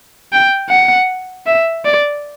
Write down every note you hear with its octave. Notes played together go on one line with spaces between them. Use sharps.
G5
F#5
E5
D5